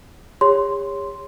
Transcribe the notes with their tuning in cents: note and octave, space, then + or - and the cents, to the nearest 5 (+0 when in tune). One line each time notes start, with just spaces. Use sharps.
G4 +45 C#5 +0 C6 -5